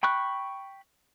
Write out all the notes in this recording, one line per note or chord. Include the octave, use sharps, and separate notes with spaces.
G5 B5 C#6 F#6